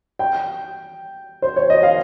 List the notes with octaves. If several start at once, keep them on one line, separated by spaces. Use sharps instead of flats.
G5
C5
C#5
D#5
F5